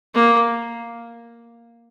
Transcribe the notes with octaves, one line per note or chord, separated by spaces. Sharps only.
A#3